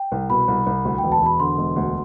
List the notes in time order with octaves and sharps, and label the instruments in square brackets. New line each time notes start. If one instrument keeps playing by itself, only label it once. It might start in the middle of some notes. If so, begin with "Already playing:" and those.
Already playing: [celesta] G5
[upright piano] C2
[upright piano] B2 [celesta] B5
[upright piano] C2
C2
D2
[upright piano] E1 [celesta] G5
[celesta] A5
[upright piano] E1 [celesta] B5
[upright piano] D3 [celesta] C6
[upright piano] E1
D2